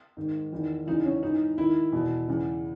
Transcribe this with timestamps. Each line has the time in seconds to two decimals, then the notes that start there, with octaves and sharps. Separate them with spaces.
0.17 G#2 D#3
0.53 E2 D#3
0.87 E2 C#3 E3 D#4
1.05 C#4
1.22 G#2 E3 D#4
1.58 D#2 D#3 E4
1.93 E2 B2
2.28 E2 C#3 E3